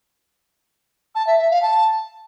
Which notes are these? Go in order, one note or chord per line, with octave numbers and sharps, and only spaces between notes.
A5
E5
E5
F5
A5